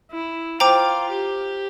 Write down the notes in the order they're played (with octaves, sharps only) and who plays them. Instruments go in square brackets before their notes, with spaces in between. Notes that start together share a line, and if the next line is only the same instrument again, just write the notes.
[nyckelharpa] E4
[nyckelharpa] F4 [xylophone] C5 G5 A#5 D6
[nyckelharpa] G4